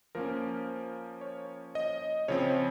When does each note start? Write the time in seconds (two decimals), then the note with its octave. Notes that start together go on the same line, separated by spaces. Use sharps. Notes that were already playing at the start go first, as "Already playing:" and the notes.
0.15 F3 A#3 C#4 A#4
1.21 C#5
1.75 D#5
2.28 C#3 F3 C4 C#5